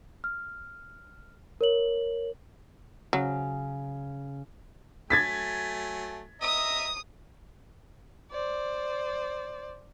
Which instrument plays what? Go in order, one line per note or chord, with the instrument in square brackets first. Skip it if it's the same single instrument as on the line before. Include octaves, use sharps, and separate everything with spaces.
[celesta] F6
A#4 C#5 F#7
[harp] C#3 [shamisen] F#3
[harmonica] F#3 A3 G#5 [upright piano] G#6 A6 B6
[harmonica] D#5 E5 A#5 [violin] D#6
[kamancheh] C5 D5